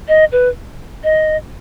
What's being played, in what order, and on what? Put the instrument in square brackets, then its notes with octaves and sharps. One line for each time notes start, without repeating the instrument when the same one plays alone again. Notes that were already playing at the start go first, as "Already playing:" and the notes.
[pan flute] D#5
B4
D#5